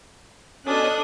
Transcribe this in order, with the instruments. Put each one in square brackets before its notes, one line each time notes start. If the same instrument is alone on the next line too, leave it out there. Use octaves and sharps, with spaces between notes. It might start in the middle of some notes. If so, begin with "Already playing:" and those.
[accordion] B2 C#4 [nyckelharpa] D4 [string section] A4 D#6 F#6